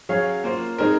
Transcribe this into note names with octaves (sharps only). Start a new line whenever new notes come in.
F#3 C#4 G#4 C#5 F5
A#3 F4 C5
G#3 C4 D#4 A#4